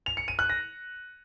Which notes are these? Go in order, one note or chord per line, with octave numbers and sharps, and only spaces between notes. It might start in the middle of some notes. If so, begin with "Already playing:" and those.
F7
C#7
D#7
F#6
A#6